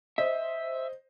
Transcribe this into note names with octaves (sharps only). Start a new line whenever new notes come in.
C5 D#5 E5